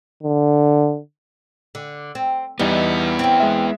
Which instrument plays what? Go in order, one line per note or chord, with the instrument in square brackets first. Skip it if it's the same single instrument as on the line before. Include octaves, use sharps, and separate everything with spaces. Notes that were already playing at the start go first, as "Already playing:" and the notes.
[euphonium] D3
[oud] D3
C4
[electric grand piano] E2 G3 [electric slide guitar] B3 E4 [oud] D#4
[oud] C4 C#4
[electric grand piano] G#3 E5